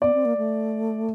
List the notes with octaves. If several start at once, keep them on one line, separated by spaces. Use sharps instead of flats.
B3 D5
C4
A#3
A3